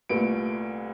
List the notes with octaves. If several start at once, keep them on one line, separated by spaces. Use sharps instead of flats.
C2 A#2 A3 B4 D7